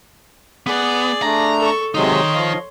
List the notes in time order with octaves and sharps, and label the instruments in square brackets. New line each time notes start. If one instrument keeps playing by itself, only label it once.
[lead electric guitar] B3 [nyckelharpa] G#4 D5
[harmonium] A3 D4 [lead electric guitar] A#5
[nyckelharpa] A4 C#6
[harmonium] C3 F#3 G#3 [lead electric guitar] D#3 D#4 [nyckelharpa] C#5 C6
[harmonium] F3 D#5 F5